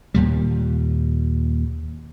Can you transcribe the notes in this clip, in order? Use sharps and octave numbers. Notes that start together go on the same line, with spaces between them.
D#2 A#2 G3